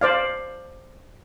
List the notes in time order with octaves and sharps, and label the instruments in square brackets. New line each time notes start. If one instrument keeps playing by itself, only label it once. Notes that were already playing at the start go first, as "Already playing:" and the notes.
[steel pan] C5 D5 F5